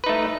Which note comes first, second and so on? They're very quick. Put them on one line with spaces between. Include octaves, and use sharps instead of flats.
B4 D#4 A3